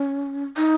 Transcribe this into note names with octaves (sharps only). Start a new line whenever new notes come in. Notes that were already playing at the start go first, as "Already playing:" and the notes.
Already playing: C#4
D#4